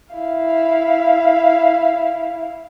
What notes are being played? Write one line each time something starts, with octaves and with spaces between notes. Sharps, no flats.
E4 F5